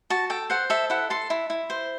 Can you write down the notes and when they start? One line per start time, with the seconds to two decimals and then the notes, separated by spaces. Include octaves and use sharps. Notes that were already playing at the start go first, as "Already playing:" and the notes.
0.10 F#4 A5
0.30 A4 G5
0.50 C5 F#5
0.70 A4 E5
0.90 E4 F#5
1.10 A4 C6
1.30 E4
1.50 E4
1.70 C5